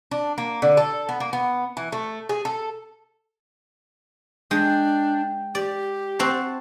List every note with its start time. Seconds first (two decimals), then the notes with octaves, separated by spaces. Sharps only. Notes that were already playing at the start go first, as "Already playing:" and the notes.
0.11 D4
0.38 A#3
0.62 D3
0.77 A4
1.09 B3
1.20 A#3
1.33 B3
1.77 E3
1.92 A3
2.29 G#4
2.45 A4
4.51 G#3 D4 G5
5.55 G4 D5
6.19 C4 F#4 C5 A5